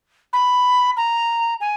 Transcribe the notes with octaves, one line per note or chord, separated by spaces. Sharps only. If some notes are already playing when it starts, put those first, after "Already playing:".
B5
A#5
G#5